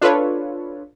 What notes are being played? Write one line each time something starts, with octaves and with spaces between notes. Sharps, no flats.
D4 F4 A4 B4 C#5